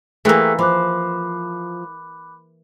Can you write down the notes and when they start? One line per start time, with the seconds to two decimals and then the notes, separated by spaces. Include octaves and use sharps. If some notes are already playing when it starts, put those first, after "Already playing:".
0.25 E3 A3 A#3 G4 G#4 E6 F#6 B6
0.59 F3 B5 D6 F#6